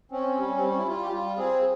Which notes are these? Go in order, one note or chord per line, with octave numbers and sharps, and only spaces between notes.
C4 C#4
G3
G3 C4
C#4
E4
G3 F4
G4
G3 F4
C4 G#4